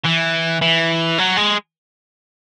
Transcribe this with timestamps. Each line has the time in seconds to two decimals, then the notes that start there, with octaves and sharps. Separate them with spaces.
0.05 E3
0.62 E3
1.18 F#3
1.37 G#3